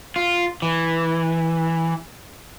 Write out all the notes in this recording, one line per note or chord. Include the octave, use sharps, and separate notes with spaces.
F4
E3